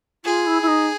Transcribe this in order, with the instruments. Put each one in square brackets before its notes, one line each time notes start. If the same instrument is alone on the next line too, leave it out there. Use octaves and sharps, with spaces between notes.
[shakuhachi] F4 [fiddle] G#4
[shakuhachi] E4
E4
D#4